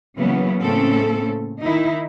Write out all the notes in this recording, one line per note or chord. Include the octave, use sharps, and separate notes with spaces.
C#3 E3 F#3 A#3 B3 C#4
A2 C#3 A#3 C4 C#4 A4
D#3 D#4 E4